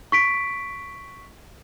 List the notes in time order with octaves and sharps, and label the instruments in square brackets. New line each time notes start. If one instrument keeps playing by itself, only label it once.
[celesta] C#6 B6 D7